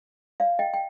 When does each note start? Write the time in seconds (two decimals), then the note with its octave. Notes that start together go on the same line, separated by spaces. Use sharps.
0.40 D5 F5
0.59 D#5 G5
0.74 G5